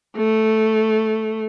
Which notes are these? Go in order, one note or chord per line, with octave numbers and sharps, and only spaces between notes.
A3